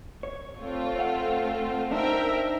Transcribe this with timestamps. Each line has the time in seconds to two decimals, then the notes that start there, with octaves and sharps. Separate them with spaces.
0.23 C#5
0.59 A3 C4 F4
0.99 F5 F#5
1.91 D4 D#4 A#4 C5 E5 G5